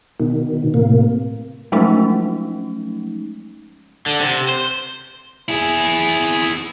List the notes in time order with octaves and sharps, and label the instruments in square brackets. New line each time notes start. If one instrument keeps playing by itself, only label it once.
[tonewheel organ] B2 D#3
A2 C3 A#3
[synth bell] F3 F#3 G#3 A3 C#4 D#4
[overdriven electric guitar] D3
C3
C5
E4 G#4